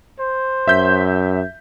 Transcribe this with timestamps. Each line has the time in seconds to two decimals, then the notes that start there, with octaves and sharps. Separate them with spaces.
0.20 C5
0.68 F#2 E5 G6 B6